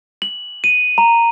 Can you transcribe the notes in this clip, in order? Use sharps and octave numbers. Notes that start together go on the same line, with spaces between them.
F#7
D#7
A#5